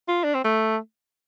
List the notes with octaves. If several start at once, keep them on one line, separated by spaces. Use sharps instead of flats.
F4
D4
C4
A3